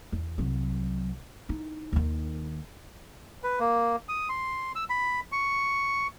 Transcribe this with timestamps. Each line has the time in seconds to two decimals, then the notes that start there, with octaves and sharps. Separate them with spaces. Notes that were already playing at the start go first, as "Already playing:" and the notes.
0.12 E2
0.38 C2 F#3
1.49 D#4 E4
1.93 D#2 D#3
3.44 B4
3.60 A#3
4.09 D#6
4.29 C6
4.76 E6
4.90 B5
5.32 C#6